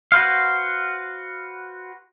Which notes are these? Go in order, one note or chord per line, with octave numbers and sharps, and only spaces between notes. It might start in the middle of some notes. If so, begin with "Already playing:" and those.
F#4 B4 C5 F5